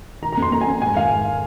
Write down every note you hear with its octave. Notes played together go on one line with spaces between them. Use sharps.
D#3 A#5
A#5
F2
C6
F2 A#5
G#5
F2
G#2 G#5
D#3 F5
G#2